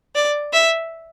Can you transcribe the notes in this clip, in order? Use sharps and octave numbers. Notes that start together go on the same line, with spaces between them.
D5
E5